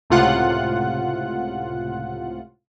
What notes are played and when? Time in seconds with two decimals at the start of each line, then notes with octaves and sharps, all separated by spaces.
0.10 C#2 A2 C3 F4 F#5 F#6